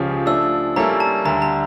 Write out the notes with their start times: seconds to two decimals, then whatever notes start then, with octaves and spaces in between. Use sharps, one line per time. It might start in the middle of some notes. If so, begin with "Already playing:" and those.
Already playing: C#2 C#3 F3 C#4 G4
0.26 F3 A3 D4 E6
0.76 G3 A#3 C#4 E4 A4 A#5
1.00 A5
1.25 D2 D3 G3 A#5
1.42 A#5